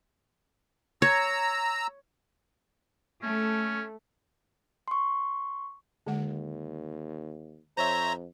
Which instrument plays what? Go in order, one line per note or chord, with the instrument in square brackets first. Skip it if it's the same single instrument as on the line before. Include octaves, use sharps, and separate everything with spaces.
[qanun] C#5 [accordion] A#5 E6
[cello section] A3 [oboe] C#4
[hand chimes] C6 C#6
[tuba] D#2 [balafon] D3 G#3 F#5
[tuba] F2 [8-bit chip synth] C5 C#5 E5 [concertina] A#5